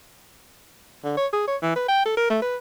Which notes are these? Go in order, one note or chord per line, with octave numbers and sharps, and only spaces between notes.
D3
C#5
G#4
C#5
E3
B4
G5
A4
A#4
A3
B4